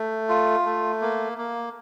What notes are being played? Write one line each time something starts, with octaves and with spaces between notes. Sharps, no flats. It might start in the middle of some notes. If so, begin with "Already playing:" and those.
Already playing: A3
F4
A3
A#3
A#3